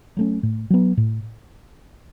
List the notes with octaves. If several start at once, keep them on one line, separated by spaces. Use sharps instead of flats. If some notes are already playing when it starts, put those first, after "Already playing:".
F#3 A3 C#4
A2
F#3 B3
A2